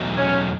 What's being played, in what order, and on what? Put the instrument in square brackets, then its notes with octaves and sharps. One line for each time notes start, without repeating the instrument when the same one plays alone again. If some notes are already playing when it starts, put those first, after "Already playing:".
Already playing: [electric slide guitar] E2 B2 F#3 A3 D#4
[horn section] C#4